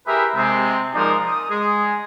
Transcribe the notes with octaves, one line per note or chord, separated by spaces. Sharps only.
E4 G4 G#4 A#4 B4 E5
C3 G#3 C4
F3 G#3 D#4 A#4 C5 D5
D#6
G#3 G#4